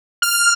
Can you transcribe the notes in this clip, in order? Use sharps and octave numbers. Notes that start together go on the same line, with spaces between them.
F6